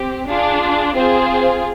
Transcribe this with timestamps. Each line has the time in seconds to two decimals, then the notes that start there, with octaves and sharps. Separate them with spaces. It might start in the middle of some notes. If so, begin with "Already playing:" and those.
Already playing: C4 G4
0.27 D4 F4 G#4
0.95 C4 F4 G#4 C5